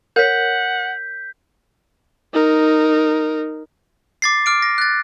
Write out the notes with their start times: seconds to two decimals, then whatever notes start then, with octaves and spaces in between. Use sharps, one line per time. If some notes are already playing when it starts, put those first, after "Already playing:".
0.16 A#4 C#5 F#5 G6 B6
2.34 D#4 A#4
4.22 D6 A6 C7
4.46 D6 F6 D7
4.62 A#6
4.78 F#6 A6